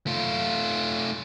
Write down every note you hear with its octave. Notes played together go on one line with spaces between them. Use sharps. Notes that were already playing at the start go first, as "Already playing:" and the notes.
A3 F4